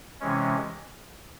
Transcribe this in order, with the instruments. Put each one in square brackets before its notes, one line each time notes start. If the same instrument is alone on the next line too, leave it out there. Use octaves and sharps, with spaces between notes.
[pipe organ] C3 E3 G#3 C#4